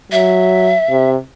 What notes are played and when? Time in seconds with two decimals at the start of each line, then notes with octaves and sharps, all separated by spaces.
0.12 F#3 E5
0.90 C3